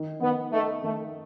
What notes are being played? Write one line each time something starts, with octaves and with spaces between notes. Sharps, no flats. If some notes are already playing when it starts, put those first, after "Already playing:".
Already playing: D#3
D#3 B3
A3 D#4
D#3 A3